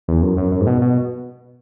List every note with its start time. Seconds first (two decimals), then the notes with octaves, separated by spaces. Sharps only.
0.08 E2
0.22 F#2
0.37 F#2
0.52 F#2
0.61 G#2
0.67 B2
0.82 B2